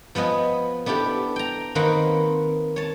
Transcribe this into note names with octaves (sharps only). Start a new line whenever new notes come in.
F3 B3 B4 D#5 G#5
B3 D4 E4 G4 A4
G5 A#5
D#3 A#3 C4 B4 F#5
C#5 A5